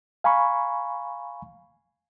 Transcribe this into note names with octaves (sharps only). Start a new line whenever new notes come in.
F5 G#5 A#5 B5 C#6